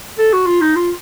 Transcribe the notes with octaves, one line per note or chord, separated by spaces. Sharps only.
A4
F#4
F4
D#4
F4